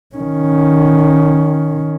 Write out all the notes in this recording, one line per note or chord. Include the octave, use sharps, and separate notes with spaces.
D#3 C#4